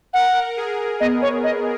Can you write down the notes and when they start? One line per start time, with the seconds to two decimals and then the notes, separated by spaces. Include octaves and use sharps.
0.13 A#4 F#5
0.57 G#4
1.00 B3 D#5
1.22 C#5
1.44 D#5